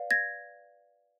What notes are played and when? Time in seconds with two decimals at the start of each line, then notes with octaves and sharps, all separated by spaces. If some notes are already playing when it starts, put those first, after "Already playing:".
Already playing: B4 D5 F5
0.11 G#6 A#6